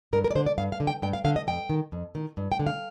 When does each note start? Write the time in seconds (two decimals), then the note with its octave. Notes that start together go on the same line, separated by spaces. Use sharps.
0.13 G2 A#4
0.24 A#4
0.31 D5
0.35 D3 C5
0.46 D5
0.58 G2 F5
0.72 F5
0.80 D3
0.87 G5
1.02 G2 G5
1.13 F5
1.24 D3 F5
1.36 D#5
1.47 F2 G5
1.70 D#3
1.92 F2
2.15 D#3
2.37 G2
2.52 G5
2.59 D3
2.67 F5